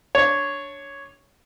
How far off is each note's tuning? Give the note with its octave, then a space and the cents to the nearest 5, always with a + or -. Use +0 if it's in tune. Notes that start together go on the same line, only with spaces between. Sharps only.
D4 +0 C#5 +0